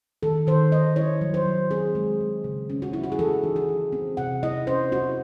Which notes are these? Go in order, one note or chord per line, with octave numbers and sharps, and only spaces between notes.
D#3 A4
D#3 C5
D#3 D#5
E4 C#5
F#3
C5
F#3
C4 G#4
G#3
G#3
C#3
C#4
F#4
E4
F#4
G#4
E3 A4
D#4
G#4
E3
C4
C3 F#5
E4 D#5
C#4 C5
E4 F#4